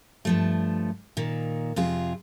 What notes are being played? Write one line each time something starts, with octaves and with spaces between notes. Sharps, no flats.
G2 F3 A3
A#2 D#3
F2 C3 F4 G#4